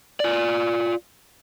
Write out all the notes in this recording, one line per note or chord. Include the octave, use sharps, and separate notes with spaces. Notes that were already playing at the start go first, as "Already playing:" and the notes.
F4 D5